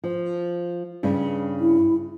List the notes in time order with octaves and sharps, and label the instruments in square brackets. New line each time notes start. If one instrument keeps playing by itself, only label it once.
[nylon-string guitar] F3
G2 C#3
[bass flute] E4